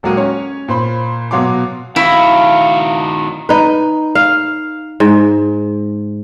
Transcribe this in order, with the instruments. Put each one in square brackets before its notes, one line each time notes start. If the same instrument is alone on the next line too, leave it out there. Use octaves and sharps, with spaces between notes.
[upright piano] D#1 F#3 G#3 A#3 F#4 D#7
C#4 C#5
A#2 C5 B5
B2 F#3 F#4 F5 C6 D6
[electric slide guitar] D#3 F#4 [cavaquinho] E4 [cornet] F5
[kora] D#4 B4
F5
G#2